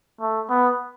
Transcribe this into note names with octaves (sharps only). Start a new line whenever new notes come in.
A3
B3